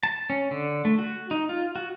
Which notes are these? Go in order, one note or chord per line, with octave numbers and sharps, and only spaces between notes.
A5
C#4
D3
A3
F#4
D#4
F4
F#4